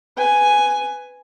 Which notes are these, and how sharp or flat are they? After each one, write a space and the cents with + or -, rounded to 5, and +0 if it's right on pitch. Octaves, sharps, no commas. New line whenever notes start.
B4 +15 G#5 +0